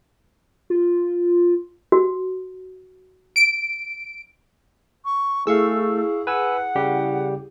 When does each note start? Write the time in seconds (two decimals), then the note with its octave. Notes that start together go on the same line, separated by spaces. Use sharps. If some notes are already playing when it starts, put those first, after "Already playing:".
0.70 F4
1.92 F#4
3.36 D7
5.05 C#6
5.47 A3 E4 G#4 F5 C#6 E6
6.27 B4 F#5 G#5 E6
6.75 C#3 G3 G4